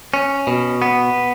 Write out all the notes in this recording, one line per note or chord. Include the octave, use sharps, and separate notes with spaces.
C#4
B2
B3